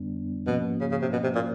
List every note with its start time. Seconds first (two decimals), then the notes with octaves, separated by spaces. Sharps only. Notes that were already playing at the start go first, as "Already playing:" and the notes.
Already playing: F2 D3 G3 B3 D4
0.47 G#2 B2 F3 A#3 C#4 F#4
0.80 C#3
0.91 C#3
1.01 C3
1.12 B2
1.23 C3
1.35 A#2